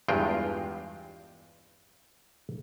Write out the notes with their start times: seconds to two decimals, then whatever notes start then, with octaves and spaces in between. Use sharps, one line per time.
0.08 E2 G2 G#3 F4 G5